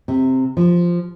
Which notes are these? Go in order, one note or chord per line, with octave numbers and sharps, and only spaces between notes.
C3
F3